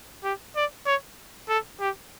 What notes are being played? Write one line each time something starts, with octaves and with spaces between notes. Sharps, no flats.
G4
D5
C#5
A4
G4